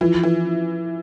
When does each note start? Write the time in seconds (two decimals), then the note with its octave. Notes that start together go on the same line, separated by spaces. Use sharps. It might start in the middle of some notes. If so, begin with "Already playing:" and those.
0.01 E3 F3
0.23 E3